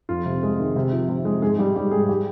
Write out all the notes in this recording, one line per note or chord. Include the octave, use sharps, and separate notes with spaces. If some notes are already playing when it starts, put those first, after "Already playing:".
F2 F4
C3
G#3
D#3
C3
F3
C3
G#3
G#2 G#4
G3 G4
G3 G4
G#2 G#4
G4